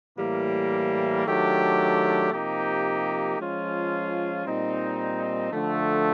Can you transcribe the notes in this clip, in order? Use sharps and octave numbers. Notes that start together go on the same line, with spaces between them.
A2 E3 G3 A#3
D#3 F#3 A3 D4 G4
C3 F3 A#3 D#4 G4
F3 G#3 C#4 F4
A#2 G3 C4 D#4
D3 F3 A3